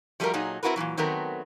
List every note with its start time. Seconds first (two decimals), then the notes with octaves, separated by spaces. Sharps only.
0.20 F3 G3 A3 F4 F#4 A#4
0.33 A#2 F#3 D#4 G#4
0.63 C4 E4 F#4 A#4 B4
0.76 A#2 C#3 E3 F#3
0.97 D#3 F#3 A3 B3 C4 A#4